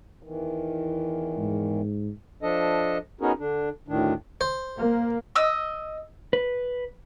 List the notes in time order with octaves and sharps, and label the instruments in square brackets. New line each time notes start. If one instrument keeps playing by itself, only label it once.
[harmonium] E2 D#3 E3
[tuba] G#2
[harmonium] F3 D4 A4 D#5
B3 C#4 D#4 F#4 G#4 A#4
D3 D4
D2 A2 D#3 D4
[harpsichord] C5
[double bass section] A#3
[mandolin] D#5 E6
[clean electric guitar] B4